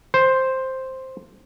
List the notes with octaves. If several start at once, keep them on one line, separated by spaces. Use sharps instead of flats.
C5